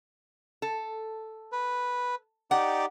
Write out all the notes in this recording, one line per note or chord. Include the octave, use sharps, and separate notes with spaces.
A4
B4
D#4 G4 D5 F#5